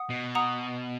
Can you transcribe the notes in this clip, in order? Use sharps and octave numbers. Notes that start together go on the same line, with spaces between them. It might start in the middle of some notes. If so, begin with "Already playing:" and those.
Already playing: F#5 D#6
B2
F#5 A#5 D#6